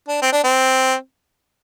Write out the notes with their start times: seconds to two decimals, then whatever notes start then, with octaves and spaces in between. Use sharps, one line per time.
0.08 D4
0.22 C4
0.33 D4
0.44 C4